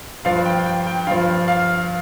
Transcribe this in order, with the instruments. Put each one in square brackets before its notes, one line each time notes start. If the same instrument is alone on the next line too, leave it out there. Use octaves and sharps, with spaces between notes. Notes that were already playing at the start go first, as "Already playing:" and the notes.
[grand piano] G2 F3 F5
G5
G5
G5
G2 F3 F5
F5